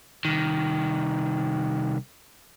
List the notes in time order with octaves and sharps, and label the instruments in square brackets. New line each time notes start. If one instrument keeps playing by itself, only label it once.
[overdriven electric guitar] C2 D#3